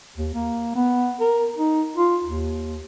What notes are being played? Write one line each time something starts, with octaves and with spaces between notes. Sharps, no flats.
D#2
A#3
B3
A#4
D#4
F4
D#2